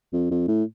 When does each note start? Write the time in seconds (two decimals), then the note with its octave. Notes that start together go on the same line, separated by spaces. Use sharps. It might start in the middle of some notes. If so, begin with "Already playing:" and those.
0.13 F2
0.31 F2
0.48 A2